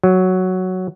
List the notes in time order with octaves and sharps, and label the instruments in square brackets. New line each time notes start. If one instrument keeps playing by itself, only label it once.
[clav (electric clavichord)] F#3